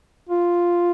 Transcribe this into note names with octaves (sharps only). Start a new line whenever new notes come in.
F4